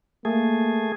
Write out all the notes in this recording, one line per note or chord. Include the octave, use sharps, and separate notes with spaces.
A3 A#3 G#4